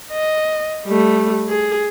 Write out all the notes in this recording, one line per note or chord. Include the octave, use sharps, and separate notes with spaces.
D#5
G3 A3
G#4